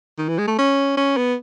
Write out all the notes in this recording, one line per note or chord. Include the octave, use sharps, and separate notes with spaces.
D#3
E3
G#3
A3
C#4
C#4
B3